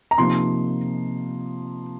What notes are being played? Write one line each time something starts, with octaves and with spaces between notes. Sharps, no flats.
A#5
C3 F3 A#3 D#4 C6